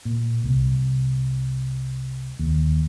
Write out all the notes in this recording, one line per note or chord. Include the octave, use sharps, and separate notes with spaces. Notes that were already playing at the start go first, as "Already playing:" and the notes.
A#2
C2
D#2